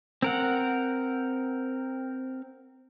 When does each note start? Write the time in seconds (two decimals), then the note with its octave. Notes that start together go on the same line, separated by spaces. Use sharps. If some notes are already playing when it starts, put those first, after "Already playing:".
0.22 C4 A#4 F#5